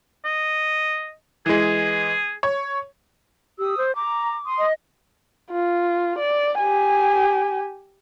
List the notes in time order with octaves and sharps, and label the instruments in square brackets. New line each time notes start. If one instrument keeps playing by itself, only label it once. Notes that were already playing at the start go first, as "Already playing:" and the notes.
[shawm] D#5
[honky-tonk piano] E3 G#3 [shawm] G#4
[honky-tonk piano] C#5
[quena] G4 [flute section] D#6 E6
[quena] C5
[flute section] A#5 [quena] D6
[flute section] C6 D#6
[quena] D#5
[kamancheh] F4
D5
G4 G#5